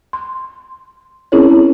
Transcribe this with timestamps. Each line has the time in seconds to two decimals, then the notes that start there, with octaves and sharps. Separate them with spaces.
0.13 C6
1.32 C4 C#4 E4 G#4 A#4 C#5